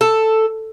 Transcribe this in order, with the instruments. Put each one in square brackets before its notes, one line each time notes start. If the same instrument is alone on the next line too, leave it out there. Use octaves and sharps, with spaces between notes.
[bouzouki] A4